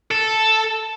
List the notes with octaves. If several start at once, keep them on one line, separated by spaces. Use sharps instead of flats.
A4